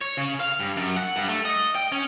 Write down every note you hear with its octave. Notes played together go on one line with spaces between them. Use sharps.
C#5
C#3
F5
G2
F#2
F#5
G2
A3
D#5
G5
C#4